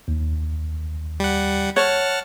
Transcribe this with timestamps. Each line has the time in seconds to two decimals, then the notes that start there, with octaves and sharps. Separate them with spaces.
0.08 D#2
1.20 G3 F#5
1.76 C#5 F#5 A5 F6